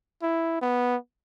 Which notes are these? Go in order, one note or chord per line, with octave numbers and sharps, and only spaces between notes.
E4
B3